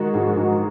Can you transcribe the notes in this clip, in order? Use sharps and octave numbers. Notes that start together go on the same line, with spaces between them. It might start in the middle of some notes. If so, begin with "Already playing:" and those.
Already playing: D#3 G#3 F#4
G#2 G#4
G#2 A#4